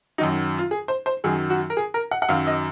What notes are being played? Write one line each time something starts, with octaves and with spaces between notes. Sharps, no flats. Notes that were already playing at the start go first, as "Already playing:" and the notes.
F#2 D#3 F#3 D#4
F4
G#4
C5
C5
F#2 D#3 F#3 G#4
F#4
A#4
G#4
A#4
F#5
F#5
F#2 D#3 F#3 F5
D#5